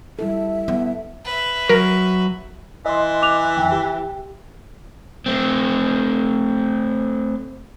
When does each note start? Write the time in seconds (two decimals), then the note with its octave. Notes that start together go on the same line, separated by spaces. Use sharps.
0.19 G3 E4 A4 E5
0.68 B3
1.25 B4 E5
1.69 F#3 A#4
2.86 E3 D#5 C6
3.22 D6 F#6 F7
3.57 F2 D#3 G5
3.72 G4
5.26 A3 C4